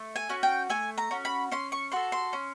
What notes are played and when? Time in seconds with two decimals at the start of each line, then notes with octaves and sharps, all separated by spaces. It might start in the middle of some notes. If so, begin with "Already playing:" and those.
Already playing: A3
0.16 G#5
0.29 C#4 F#4
0.43 G5
0.70 A3 G#5
0.98 A#5
1.11 C#4 F#4
1.25 B5
1.52 C#4 C6
1.72 C#6
1.92 F#4 A4 C6
2.12 C6
2.33 C#4